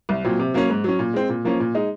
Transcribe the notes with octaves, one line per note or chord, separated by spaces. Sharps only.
C2
A#2 F#3 C4
C3
F#3 A#3 C#4
G#2
F#3 C#4
A#2
G#3 C4
A#2
F3 A#3 C#4
A#2
G#3 D#4